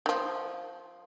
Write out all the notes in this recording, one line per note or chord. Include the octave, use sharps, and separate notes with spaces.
D#3
F3